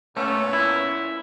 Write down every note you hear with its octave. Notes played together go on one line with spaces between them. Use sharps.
A#2 A3 B3 C#4
E4